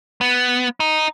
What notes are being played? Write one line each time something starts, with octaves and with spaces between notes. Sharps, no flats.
B3
D#4